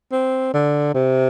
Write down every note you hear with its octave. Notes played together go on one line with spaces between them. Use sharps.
C4
D3
C3